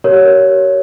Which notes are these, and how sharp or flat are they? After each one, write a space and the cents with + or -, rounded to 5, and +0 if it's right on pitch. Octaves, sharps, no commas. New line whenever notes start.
G4 -40 A#4 +0 C#5 +10